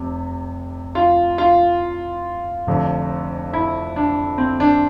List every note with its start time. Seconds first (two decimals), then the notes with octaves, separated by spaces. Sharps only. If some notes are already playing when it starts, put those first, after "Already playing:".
Already playing: F1 C3
0.95 F4
1.38 F4
2.67 F1 F2 D3
3.53 E4
3.96 D4
4.38 C4
4.60 D4